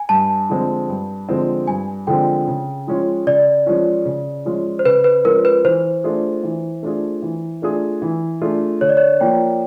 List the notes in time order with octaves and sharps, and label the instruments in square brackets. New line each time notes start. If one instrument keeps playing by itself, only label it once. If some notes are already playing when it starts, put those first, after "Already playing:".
Already playing: [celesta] G#5
[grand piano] G2 [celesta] A5
[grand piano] D3 F3 G#3 C4
G2
D3 F3 G#3 C4
[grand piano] G2 [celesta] G#5
[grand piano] D3 F3 G#3 C4 [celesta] G5
[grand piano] C#3
F3 G#3 C#4 F4
[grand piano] C#3 [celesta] D5
[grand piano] F3 G#3 C#4 F4
C#3
F3 G#3 C#4 F4
[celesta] C5
[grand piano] C#3 [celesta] B4
[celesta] B4
[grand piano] F3 G#3 C#4 F4 [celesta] A#4
[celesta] B4
[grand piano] E3 [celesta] C5
[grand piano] A3 D4 F4 G#4
E3
A3 D4 F4 G#4
E3
A3 D4 F4 G#4
E3
A3 D4 F4 G#4
[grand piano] D3 [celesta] C#5
[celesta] D5
C#5
[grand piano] F3 A#3 [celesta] G5